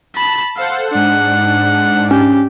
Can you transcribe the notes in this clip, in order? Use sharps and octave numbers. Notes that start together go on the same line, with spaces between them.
A5 B5
A4 C5 F5 F#5
G#2 D4 F#5
C#4 G4